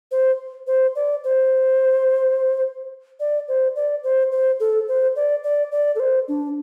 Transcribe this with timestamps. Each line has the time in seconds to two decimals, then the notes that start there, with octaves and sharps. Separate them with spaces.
0.12 C5
0.67 C5
0.96 D5
1.24 C5
3.20 D5
3.48 C5
3.76 D5
4.04 C5
4.32 C5
4.60 A4
4.88 C5
5.16 D5
5.44 D5
5.72 D5
5.96 A4
6.00 C5
6.28 D4